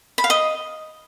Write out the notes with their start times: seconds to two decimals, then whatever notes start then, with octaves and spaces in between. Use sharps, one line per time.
0.18 B5
0.24 F5
0.30 D#5